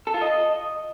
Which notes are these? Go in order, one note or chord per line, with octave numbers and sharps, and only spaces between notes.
A4
F4
D#5